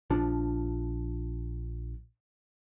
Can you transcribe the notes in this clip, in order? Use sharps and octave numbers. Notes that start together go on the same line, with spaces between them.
A#1 F3 D4